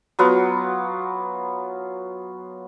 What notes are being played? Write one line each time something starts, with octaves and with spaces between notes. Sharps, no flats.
F#3 B3 F4 F#5